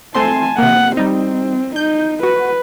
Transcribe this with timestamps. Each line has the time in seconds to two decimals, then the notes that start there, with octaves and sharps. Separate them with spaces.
0.15 A3 C4 G#5 A5 C6
0.58 C3 A#3 F#5
0.97 G3 C4 D#4
1.76 D#4 G6
2.23 F#4 B4